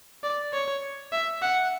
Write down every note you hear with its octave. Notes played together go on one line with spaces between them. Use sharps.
D5
C#5
E5
F#5